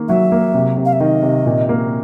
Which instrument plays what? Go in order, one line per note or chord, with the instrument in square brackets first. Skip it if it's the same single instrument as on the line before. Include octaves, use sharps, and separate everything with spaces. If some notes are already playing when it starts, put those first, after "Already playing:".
Already playing: [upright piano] D#3 A#3
[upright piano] F#3 [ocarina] E5
[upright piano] A#3
C3
C3
[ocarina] F5
E5
[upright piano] D#3 [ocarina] D#5
[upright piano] C3
A#2
A#3